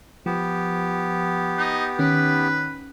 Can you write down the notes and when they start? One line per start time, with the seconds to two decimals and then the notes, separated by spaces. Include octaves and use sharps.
0.26 F3 B3 G4
1.58 D#4
1.99 D#3 C#4 B4